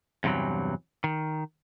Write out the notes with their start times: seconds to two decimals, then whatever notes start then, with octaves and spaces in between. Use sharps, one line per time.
0.24 E2 G2 C3 E3 F#3
1.04 D#3